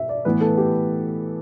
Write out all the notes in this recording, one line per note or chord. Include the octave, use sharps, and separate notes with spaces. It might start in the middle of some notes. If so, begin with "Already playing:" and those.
Already playing: B2 E5
D5
A2 E3 B3 B4
A4
G4